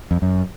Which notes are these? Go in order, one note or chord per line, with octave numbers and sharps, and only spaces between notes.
F2
F#2